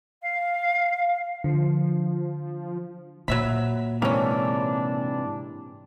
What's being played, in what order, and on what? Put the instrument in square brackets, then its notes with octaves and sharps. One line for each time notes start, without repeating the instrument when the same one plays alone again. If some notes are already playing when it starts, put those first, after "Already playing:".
[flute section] F5
[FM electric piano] D3 [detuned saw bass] F3
[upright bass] A#2 [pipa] F#3 E5 B5
[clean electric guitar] G#2 C3 E3 [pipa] A#3 C#4 [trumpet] D4